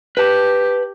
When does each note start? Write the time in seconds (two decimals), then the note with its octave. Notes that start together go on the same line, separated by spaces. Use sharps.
0.17 G4 B4 A5